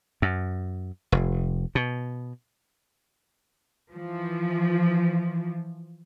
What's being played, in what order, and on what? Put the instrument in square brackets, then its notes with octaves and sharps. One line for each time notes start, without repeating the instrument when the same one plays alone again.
[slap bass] F#2
F1
B2
[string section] E3 F3